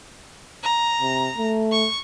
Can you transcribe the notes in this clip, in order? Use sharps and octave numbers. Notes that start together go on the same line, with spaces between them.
A#5
C3
A3
C#6